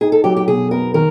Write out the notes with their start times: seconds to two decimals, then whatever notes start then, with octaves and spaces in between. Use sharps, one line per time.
0.01 D#4 G#4
0.12 A4
0.24 F#3 G4
0.37 G4
0.48 B2 G#4
0.71 B3 A#4
0.94 D#3 A#4